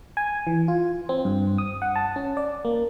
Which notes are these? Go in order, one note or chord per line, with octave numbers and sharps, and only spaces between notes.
G#5
E3
F4
C4
G2
D#6
F#5
A5
C#4
D5
A#3